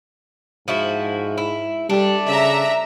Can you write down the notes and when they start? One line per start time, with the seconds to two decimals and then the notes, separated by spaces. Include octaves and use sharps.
0.68 G#2 F3 E4 F#4
1.38 E4
1.90 G3 A3 D4
2.27 C#3 E5 A#5